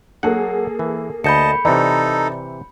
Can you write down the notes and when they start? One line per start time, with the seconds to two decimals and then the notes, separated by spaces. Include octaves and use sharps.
0.23 F#3 A#3 G#4 A4 F#5
0.79 E3
1.24 D2 D#5 A5 B5 G6 C#7
1.65 C3 E3 D#4 A4 D5 A#5